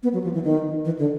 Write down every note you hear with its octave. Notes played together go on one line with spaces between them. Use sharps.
B3
F#3
F3
E3
D#3
E3
D3